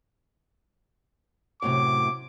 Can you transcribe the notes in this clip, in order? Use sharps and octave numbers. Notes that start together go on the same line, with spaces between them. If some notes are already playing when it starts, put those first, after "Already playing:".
F#2 A2 C3 D6